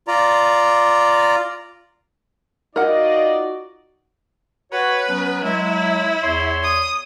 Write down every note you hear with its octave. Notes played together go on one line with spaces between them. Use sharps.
F4 D5 A#5
D#4 F4 F#4 A#4 D5 D#5 F#5
F#4 B4 C#5 F#5
F#3 B3 C#4
F#3 G#3 E4
E2 C#5 C6
D#6